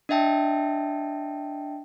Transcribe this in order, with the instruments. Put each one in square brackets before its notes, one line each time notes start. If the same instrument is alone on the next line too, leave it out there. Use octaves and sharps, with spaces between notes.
[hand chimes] D4 D#5 E5 G5 A5